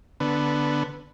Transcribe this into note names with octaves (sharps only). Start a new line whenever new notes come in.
D3 B3